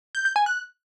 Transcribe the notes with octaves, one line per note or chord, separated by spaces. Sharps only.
G6
G6
G#5
F#6